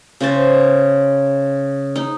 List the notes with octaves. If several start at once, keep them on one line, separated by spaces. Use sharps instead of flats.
C#3 C5 A5
D#4